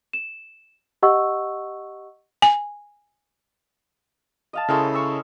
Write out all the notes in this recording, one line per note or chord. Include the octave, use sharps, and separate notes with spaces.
E7
G4 D#5 F#5 C#6 E6
G#5
D#5 F5 A5
C#3 G#3 C#4 E4 A4 A#4
C#6 E6